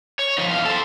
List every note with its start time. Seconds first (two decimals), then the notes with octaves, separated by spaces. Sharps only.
0.19 C#5
0.38 F3 D#4
0.51 E2 F5
0.65 A4 C5